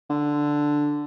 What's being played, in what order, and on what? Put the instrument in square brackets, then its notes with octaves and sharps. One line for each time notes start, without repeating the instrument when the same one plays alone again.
[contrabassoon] D3